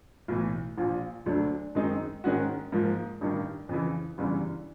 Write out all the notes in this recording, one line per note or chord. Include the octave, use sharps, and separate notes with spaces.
B1 A2 E3
A#1 A#2 F3
D2 D3 F#3 A3 D4
F#2 D#3 G#3 C4 D#4
G#2 D#3 G#3 C#4 F#4
G#2 F3 A#3
A1 G2 D#3
F2 C#3 E3
G1 F#2 C#3 E3 G3